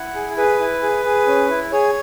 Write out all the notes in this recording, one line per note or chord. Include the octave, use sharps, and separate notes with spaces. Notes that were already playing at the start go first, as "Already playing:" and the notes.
Already playing: E4 F#5
G#4
G#4 B4
E4
G#4
G#4
C#4
E4
G#4 C#5